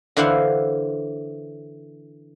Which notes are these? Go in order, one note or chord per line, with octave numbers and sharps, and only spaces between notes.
D3 E3 E4 C5 F5 F#5